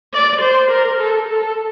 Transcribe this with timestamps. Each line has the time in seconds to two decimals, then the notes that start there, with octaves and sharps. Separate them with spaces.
0.14 D5
0.41 C5
0.71 A#4
0.99 A4
1.27 A4